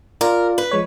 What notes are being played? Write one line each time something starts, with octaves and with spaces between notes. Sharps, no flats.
F4 A#4 D5
B4
F3 G#3 C#5